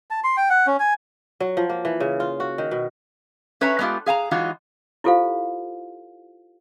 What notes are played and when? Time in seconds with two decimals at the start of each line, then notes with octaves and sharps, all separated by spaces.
0.10 A5
0.24 C6
0.37 G5
0.50 F#5
0.67 C#4
0.80 G#5
1.40 F#3
1.57 F3
1.69 A#3
1.85 E3
2.00 C#3
2.20 F4
2.40 F#4
2.58 D#3
2.71 B2
3.61 C#4 B4 C#5 E5 A#5
3.79 G#3 A3 B3 C#4 F4 G4
4.06 G#4 F5 G#5 A#5
4.31 E3 F#3 G#3 D#4 F4 F#4
5.04 E4 F4 G4 A4 C5 F5